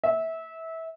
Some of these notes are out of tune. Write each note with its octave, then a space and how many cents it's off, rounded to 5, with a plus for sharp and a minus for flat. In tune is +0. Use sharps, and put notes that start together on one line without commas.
E5 -20